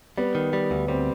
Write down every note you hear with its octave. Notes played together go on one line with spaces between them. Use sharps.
G3 B3
D#3
G3
D2
G3 C4